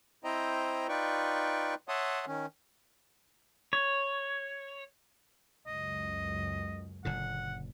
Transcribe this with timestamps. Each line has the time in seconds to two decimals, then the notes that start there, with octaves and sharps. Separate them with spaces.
0.24 C4 E4 C5 D#5 G5 A#5
0.89 D#4 F4 B4 D5 G5 C#6
1.88 C#5 E5 F#5 A5 C6 D#6
2.27 D#3 C#4
3.73 C#5
5.67 C#2 F#2 D#5
7.05 F#1 A#2 D3 F#5